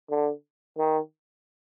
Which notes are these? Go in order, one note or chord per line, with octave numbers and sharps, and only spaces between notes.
D3
D#3